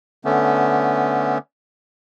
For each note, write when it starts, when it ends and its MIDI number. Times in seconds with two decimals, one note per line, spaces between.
0.25 1.38 50
0.25 1.38 57
0.25 1.38 59
0.25 1.38 61